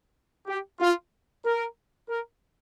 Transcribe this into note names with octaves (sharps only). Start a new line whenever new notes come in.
G4
F4
A#4
A#4